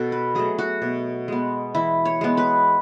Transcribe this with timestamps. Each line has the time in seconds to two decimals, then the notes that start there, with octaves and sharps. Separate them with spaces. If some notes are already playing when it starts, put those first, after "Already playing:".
Already playing: B2 F#4 A4
0.12 B4
0.35 F#3 A3 G#4
0.59 F#4
0.82 B2
1.28 G#3 B3
1.75 E3 E4
2.05 C#5
2.21 G#3 B3
2.37 B4